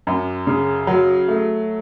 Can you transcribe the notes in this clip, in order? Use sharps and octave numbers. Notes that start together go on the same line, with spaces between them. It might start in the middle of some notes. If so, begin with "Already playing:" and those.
F#2
C#3
F#3
A3